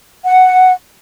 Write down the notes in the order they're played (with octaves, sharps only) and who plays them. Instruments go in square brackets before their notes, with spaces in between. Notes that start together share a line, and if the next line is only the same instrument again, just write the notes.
[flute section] F#5